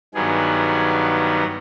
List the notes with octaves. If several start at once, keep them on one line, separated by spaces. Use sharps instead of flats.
G2 D#3 F#3 B3 G#4